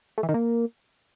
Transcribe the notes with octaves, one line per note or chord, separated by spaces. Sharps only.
A3
E3
D#3
A#3